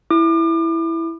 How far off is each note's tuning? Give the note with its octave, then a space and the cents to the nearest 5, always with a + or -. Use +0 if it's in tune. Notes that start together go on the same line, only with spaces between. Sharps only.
E4 +0 D6 +40